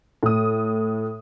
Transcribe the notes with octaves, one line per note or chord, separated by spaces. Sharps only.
A2 D#6